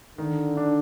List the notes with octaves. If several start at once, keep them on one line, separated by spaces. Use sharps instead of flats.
D3 D#3
D4